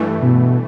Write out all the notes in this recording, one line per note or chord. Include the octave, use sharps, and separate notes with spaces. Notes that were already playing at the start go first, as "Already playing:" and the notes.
Already playing: G2 E3 A3
B2